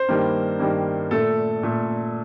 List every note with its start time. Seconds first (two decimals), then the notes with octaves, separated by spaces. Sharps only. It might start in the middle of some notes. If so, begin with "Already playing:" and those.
Already playing: C5
0.09 G2 D#3 G3 A#3
0.59 G2 D#3 G3 A#3
1.11 A#2 A3 A4
1.63 A#2 A3